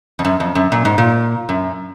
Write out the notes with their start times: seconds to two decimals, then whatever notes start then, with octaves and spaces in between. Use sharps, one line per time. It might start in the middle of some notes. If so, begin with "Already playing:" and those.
0.19 F2
0.25 F#2
0.40 F2
0.55 F#2
0.72 A#2
0.85 G#2
0.98 A#2
1.49 F#2